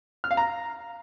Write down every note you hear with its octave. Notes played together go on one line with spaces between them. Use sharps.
F6
F5
A#5